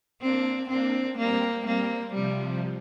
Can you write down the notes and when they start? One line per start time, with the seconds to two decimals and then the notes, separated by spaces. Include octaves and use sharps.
0.22 A#3 C4 D4
0.70 A#3 C4 D4
1.18 G3 A#3 C4
1.66 G3 A#3 C4
2.14 C3 F3 G3